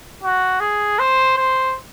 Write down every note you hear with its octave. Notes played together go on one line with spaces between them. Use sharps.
F#4
G#4
C5
C5